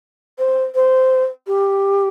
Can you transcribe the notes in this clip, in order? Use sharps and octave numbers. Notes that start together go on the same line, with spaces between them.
C5
C5
G4